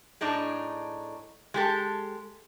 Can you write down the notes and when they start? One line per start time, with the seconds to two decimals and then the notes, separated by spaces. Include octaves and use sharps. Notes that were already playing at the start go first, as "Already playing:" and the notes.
0.21 A2 D4 D#4 G#4
1.54 G#3 G4 A4